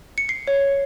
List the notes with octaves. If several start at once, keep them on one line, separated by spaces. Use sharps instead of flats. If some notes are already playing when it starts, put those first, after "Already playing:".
C#7
C7
C#5